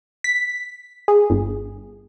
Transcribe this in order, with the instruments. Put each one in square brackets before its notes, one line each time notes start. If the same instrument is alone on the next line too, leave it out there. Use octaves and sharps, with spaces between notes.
[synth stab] B6
G#4
G1